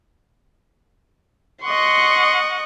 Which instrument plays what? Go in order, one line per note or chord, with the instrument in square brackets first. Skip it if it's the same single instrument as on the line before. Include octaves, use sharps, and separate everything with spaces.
[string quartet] D#5 F#5 C#6 [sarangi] C6